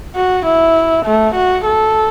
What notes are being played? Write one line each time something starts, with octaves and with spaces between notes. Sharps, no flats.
F#4
E4
A3
F#4
A4